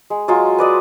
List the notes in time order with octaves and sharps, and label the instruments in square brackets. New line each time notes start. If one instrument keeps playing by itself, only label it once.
[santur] G#3
F#3 G#3 F4
B4 D5 D#5